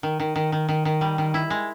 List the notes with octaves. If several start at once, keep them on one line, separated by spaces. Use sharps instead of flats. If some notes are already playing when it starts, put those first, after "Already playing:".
D#3
D#3
D#3
D#3
D#3
D#3
G3
D#3
E4
G#3